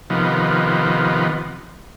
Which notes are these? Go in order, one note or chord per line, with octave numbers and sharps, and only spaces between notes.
C3 D#3 F3 B3